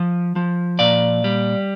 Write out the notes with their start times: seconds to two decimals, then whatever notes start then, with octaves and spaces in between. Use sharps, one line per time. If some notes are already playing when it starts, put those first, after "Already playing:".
Already playing: F3
0.36 F3
0.79 A#2 D5 F5
1.24 G3